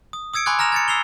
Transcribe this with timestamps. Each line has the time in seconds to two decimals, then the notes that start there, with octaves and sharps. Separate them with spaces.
0.13 D#6
0.34 D#6 E6 G#6 C#7 D7
0.46 G#5 B5 C6 D6 F#6 G#6
0.59 A#5 F6 A#6 E7 F7
0.72 G#6 A6 C#7
0.88 E6 C7 F7 G7